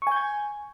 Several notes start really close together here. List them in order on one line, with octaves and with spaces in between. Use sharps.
C#6 G#5 G6 G#6